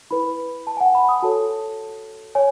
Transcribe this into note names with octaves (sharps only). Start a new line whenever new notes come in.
E4 B4 B5
A5
G#5
F#5
B5
D#6
F#4 A4 C#5 A5
C#5 G#5